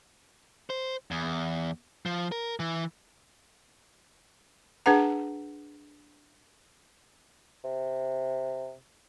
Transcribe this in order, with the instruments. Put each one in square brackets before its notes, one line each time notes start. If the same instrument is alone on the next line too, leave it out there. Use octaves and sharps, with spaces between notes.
[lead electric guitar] C5
E2
F3
A#4
E3
[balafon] D4 G#4 B4 F#5 A#5
[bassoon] C3